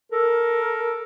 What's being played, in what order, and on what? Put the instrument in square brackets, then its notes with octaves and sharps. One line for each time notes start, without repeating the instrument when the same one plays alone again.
[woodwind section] A4 A#4